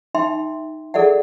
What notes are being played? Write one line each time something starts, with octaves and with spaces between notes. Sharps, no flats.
D#4 E5 G5 C6
G#4 A4 D5 E5 F#5